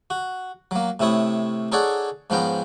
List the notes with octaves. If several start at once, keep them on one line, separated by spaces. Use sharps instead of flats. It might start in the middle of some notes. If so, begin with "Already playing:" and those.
F#4
F#3 A#3
A2 C3 E4 C#5 D#6
D#4 G#4 A4 C#5 D5 F#5
G#2 F3 B3 C#4 G5 A#5